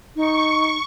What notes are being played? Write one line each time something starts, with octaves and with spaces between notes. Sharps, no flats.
D#4 C#6